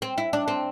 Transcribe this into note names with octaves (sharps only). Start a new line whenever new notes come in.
C4
E4
D4
C4